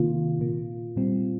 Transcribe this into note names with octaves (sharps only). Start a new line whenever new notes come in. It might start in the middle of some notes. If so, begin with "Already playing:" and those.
Already playing: C3 D#3 A#3 F4
A#2 A#3
A#2 G3 C4